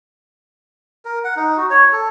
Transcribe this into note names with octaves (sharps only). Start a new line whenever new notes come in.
A#4
F#5
D#4
F#4
C#5
A4